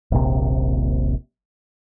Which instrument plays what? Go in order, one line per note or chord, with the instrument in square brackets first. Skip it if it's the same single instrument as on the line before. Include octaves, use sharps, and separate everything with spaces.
[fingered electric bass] D#1 A#1 C3